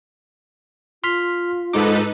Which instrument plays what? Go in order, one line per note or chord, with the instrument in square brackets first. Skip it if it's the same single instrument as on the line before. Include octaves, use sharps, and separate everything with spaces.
[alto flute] F4 [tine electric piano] C6 F6 B6
[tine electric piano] G#2 G#3 D6 [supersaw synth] D#4 A4 B4